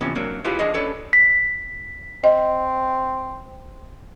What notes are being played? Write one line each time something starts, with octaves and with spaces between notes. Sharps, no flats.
C3 E3 F3 B3 C#4
F#3 A#3 C4 D4
E4 F4 G4 G#4 B4 F5
F3 D4 G#4 D#5
C#4 D4 A4 B4 C#5 D5
B6
C4 D#5